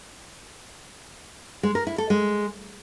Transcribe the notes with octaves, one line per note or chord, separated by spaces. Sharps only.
G#3
A#4
E4
A4
G#3